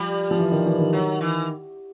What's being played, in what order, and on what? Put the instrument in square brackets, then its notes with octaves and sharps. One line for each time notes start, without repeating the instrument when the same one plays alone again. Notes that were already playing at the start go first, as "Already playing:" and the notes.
Already playing: [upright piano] F3 [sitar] G3
[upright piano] F3
E3
D#3
E3
D#3
[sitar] F#3
E3